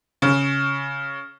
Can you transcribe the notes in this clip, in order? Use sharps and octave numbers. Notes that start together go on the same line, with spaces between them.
C#3